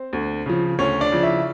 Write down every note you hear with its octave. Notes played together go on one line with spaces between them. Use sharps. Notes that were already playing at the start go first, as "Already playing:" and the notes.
Already playing: C4 C5
D2
C#3 F3
D2 C#4 C#5
D4 D5
C#3 F3
E4 E5